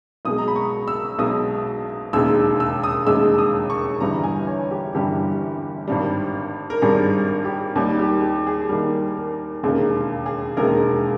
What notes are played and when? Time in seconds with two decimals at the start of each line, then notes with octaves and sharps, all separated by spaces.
0.25 B1 B2 G#3 D#6
0.38 A#5
0.48 B5
0.56 C#6
0.88 E6
1.19 B1 B2 G#3 D#6
2.13 E1 D#2 C#3 G#3 E6
2.60 E6
2.84 D#6
3.06 E1 D#2 C#3 G#3 E6
3.38 D#6
3.70 C#6
4.00 G1 G2 E3 G3 A#5
4.24 G#5
4.47 C#5
4.71 G4
4.95 G1 G2 E3 G3 G4
5.88 G#1 G2 G3
6.70 A#4
6.82 G#1 G2 G3 G#4
7.45 G4
7.76 D#2 D#3 G3
7.99 G4
8.22 G4
8.47 G#4
8.69 D#2 D#3 G3 A#4
9.17 A#4
9.63 E1 D#2 C#3 G#3 A#4
10.26 G#4
10.57 E1 D#2 C#3 G#3 A#4